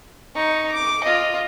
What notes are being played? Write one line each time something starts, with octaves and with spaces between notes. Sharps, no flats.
D#4 C#6
D6
F4 D#5